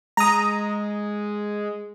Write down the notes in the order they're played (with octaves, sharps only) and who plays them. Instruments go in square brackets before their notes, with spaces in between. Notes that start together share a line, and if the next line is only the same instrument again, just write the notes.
[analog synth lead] G#3 [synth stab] A#5 D#6